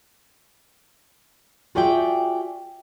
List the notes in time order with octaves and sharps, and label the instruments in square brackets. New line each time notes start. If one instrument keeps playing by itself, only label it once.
[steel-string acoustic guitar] F4 F#4 G#4 D5 E5 G5